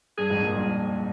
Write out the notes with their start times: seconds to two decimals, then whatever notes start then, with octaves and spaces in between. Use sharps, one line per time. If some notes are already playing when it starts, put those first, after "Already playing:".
0.18 G2 G#4
0.30 F2 G#2
0.42 G2 A#2
0.55 G2 A#2